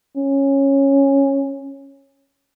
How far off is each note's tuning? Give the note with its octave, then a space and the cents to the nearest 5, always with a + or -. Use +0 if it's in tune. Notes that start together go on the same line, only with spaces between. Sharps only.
C#4 -10